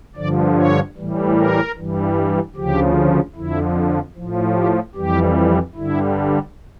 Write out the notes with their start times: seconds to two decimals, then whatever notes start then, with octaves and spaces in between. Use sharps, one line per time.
0.16 G2 D3 F3 D5
0.56 C#5
0.96 A2 E3 G3
1.36 A#4
1.76 G2 E3 G3
2.55 D2 C#3 F3 G4
3.35 F2 D3 F3 E4
4.15 A2 F3
4.55 G4
4.95 F2 E3 G3 G4
5.74 G2 D3 G3 E4